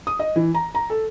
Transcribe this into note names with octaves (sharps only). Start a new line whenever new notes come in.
D#6
D#5
E3
A#5
A#5
A4